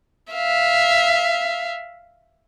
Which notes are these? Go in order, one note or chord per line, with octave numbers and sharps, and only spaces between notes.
E5 F5